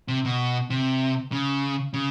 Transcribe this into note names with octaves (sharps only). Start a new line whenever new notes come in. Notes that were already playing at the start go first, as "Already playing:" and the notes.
C3
B2
C3
C#3
C#3